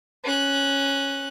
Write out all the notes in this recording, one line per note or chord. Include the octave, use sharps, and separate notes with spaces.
C#4 F#6